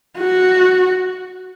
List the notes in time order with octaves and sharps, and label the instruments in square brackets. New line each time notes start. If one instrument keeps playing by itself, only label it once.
[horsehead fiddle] F#4